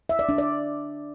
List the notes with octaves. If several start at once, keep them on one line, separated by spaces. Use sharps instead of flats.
E5
D5
D4
D5